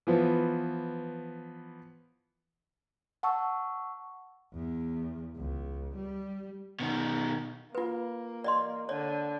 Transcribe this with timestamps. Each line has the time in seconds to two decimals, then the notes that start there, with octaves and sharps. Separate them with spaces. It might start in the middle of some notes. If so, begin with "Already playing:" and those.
0.07 E3 F3 B3
3.23 F#5 A5 C#6 E6
4.54 E2
5.37 C#2
5.97 G3
6.80 B2 D#3
7.75 A#3 F4 B4
8.44 D5 D#5 C6
8.89 D3 C#5 D5